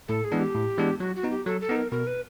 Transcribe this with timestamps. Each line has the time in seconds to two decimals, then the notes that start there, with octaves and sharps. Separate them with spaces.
0.08 A2 A4
0.24 G#4
0.32 E3 G#3 B3 D4
0.39 G4
0.54 A2
0.78 E3 G#3 B3 D4
1.00 F#3 F#4
1.16 F#4
1.23 B3 D#4
1.31 G4
1.46 F#3 A4
1.61 A4
1.69 B3 D#4
1.76 A#4
1.91 B2 A#4
2.07 B4